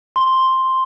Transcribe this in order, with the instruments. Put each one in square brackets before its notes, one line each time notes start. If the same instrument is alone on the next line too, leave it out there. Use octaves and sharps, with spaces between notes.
[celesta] C6